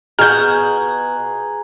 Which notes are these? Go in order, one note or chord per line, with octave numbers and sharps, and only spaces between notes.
B2 F#4 G#4 F#5 A#5 F6 G6